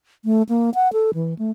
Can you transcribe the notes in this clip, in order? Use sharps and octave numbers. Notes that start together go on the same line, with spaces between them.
A3
A#3
F#5
A4
E3
A3